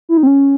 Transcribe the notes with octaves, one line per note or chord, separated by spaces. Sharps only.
E4
D#4
C4
C#4